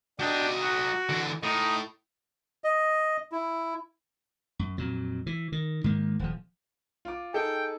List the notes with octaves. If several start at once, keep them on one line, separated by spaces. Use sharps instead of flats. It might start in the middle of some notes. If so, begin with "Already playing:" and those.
F#3 D4 G4 D#5
F#4
D3 E3
A2 D#4 D#5
D#5
E4
F#2
F2 A#2 F#3
E3
D#3
G#2 D#3 A#3
D#1 F3
F4 D6
D#4 G#4 A4 G5